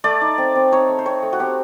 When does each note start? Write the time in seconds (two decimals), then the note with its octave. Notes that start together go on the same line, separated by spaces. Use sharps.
0.04 A3 D5
0.21 D#4
0.38 C4
0.55 C4
0.72 D#4 C#5
0.89 A3
0.99 C5
1.05 C4 C#5
1.23 A3
1.33 F#4
1.40 C4 G4